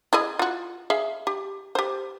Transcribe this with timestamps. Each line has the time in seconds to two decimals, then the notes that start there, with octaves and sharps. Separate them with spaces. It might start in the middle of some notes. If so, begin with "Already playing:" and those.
0.13 E4 G#4 D#5
0.39 F4 F#4
0.90 G#4 E5 F5
1.27 G4
1.75 G4 C5